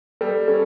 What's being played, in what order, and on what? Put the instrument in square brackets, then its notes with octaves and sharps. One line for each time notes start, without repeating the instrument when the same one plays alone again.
[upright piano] G3 [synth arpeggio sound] A4
[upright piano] C#4 [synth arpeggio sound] A4